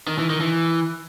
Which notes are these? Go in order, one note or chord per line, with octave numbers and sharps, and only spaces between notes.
D#3
E3
D#3
E3